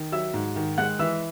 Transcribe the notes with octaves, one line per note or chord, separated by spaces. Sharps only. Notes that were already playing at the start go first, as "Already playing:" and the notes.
Already playing: D#3
F#3 E5 E6
G#2
D#3
G#3 F#5 F#6
E3 E5 E6